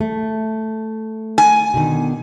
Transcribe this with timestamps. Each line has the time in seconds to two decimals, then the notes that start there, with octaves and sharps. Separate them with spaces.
0.01 A3
1.38 G#5
1.74 B2 D3 D#3